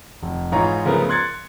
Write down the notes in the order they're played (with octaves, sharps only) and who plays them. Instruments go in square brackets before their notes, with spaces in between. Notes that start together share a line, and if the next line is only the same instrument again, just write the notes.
[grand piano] F1
G#2 E3 D#4 F4 C#5 A#5
C#3 F3 A3 B3 A#4
C6 F#6 G#6 A6 C#7